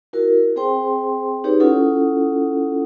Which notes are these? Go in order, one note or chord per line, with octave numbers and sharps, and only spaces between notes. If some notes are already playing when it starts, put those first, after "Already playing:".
E4 F#4 A#4
C4 G#4 C5 G5 C6
D#4 G4 G#4 B4 C#5
C#4 E4 F4 A4 F#5 D#6